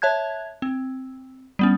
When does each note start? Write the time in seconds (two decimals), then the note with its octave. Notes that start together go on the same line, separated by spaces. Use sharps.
0.02 C#5 E5 A5 F#6 G#6
0.62 C4
1.59 G3 B3 C#4